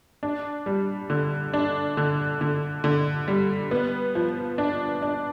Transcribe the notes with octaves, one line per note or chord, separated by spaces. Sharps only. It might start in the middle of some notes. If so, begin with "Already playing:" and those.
D4
G3
D3
D4
D3
D3
D3
G3
B3
F3
D4
D4